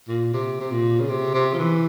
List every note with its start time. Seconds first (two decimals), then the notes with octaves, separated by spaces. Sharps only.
0.08 A#2
0.33 C3
0.60 C3
0.71 A#2
1.00 C#3
1.09 C3
1.34 C3
1.53 F3
1.58 E3